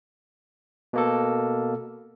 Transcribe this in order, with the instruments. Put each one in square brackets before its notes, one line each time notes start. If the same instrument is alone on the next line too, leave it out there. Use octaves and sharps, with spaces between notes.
[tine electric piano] B2 A#3 A4